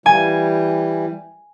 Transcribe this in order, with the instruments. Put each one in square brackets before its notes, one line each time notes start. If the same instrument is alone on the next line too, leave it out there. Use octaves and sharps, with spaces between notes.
[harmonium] E3 G3 [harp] G#5